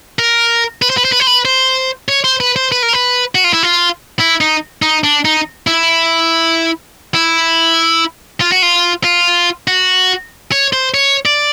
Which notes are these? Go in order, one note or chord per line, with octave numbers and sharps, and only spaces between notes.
A#4
B4
C5
B4
C5
B4
C5
B4
C5
C#5
C5
B4
C5
B4
A#4
B4
F#4
F4
E4
F4
E4
D#4
D#4
D4
D#4
E4
E4
F4
F#4
F4
F4
F#4
C#5
C5
C#5
D5